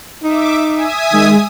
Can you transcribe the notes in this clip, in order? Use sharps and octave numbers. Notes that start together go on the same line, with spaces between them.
D#4 E5 D6
E5 G#5 D#6
D#3 G#3